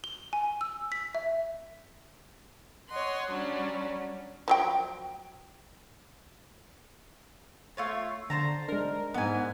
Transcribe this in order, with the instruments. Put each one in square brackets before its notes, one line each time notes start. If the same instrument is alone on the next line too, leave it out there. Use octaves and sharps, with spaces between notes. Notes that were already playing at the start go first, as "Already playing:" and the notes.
[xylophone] G7
G#5
E6
B6
E5
[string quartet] C#5 D#5 F#5 C6
F#3 G3 C#4 D4
[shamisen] F3 F#3 G5
[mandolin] A3 F4 C#5
[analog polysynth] D3 [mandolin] C5 A5 A#5
[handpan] G#3 D4 [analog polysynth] A#4
[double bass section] G#2 [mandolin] B3 G#5